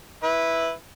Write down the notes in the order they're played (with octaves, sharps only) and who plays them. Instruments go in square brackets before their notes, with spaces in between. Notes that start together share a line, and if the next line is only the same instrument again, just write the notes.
[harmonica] E4 B4